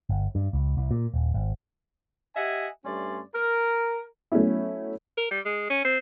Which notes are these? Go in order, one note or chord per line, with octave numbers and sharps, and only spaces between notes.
G1
G2
C#2
C2
A#2
D#1
G#1
G4 D#5 E5 F#5 G#5
G2 A3 C#4 D5 C6
A#4
F#3 A3 B3 C#4 E4
A#4
G3
G#3
C#4
C4